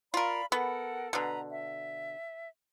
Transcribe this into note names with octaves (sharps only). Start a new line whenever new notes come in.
F4 A#4 D5 F5 B5
B3 A4 A#4 F#5
B2 D3 B4 A#5
E5